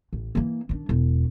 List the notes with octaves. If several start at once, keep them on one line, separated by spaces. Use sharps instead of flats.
A1
E3 A#3
D#3 D4
E1 E2